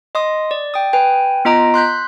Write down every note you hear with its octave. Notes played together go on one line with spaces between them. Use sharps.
D#5 C6 D#6
D5
G5 D#6
B4 G5 G#5
B3 F4 D#5 A#5 D#6 D7
C6 F#6 G6 B6